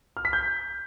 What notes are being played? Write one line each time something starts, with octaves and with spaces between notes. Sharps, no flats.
F6
B6
G6